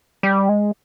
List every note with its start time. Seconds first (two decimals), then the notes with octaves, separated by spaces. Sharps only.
0.23 G3
0.49 G#3